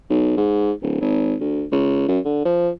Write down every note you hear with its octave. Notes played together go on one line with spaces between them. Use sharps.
B1
G#2
D1
G#1
D2
C#2
F#2
D3
F3